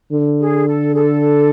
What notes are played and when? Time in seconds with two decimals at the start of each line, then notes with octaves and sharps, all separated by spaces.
0.13 D3
0.40 G#4
0.68 A4
0.92 G#4
0.96 A4